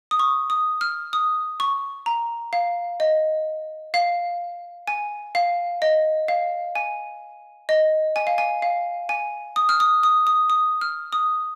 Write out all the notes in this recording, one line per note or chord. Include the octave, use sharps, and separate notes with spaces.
D#6
C#6
D#6
F6
D#6
C#6
A#5
F5
D#5
F5
G#5
F5
D#5
F5
G#5
D#5
G#5
F5
G#5
F5
G#5
D#6
F6
D#6
D#6
D#6
D#6
F6
D#6